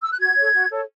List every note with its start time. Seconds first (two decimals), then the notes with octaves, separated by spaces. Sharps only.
0.03 E6
0.11 F#6
0.19 F#4 G#6
0.36 A4 C#5
0.54 F#4
0.70 A4 C#5